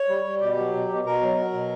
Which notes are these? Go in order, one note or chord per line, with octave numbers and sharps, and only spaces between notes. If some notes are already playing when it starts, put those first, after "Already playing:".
Already playing: C#5
G3
G3
B2 G4
F#3
B2
B2
B2 A#4
F#3
F#3
B2